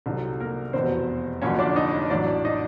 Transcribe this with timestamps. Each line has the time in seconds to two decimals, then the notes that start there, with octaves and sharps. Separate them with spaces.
0.06 C2 C3 D#3 F#3 A4
0.40 A#3 A#4
0.73 F1 E2 B2 C4 C5
1.42 F1 F2 D3 F#3 A#3 C#4 C#5
1.59 D4 D5
1.76 D#4 D#5
2.10 A1 A2 F#3 D4 D5
2.45 D#4 D#5